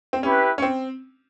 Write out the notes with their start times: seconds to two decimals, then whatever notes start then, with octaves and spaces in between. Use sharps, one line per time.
0.13 C4
0.22 C#4 E4 G4 B4
0.58 C#4
0.62 C4